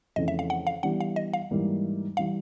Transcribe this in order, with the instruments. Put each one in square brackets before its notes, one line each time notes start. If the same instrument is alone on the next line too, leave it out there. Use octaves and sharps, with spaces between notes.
[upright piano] F2 C#3 E3 A3 [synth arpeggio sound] D#5
[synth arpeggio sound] E5
F5
F#5
F5
[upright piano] E3 G3 B3 D4 G4 [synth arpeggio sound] F#5
[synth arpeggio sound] F5
D#5
F5
[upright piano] G#2 E3 G3 A#3 D#4
[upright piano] E3 G3 [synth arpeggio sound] F5